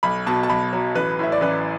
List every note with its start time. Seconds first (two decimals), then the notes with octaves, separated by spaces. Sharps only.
0.03 B1 B5
0.26 B2 A5
0.43 A5
0.49 B1 B5
0.73 F#3
0.95 A1 B4
1.19 A2 E5
1.32 D5
1.41 A1 B4